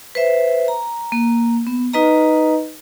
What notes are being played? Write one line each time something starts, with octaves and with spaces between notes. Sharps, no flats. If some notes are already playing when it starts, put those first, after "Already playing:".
B4 C5 E5
A#5
A#3
B3
D#4 B4 D#5 A#5